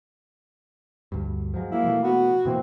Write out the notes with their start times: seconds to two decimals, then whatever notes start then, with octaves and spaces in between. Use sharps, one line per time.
1.12 D2 G2
1.54 F3 F#3 G#3
1.71 A#3 E4
1.84 B2 E3 A3
2.04 B3 F#4
2.45 B2 E3 A#3 C4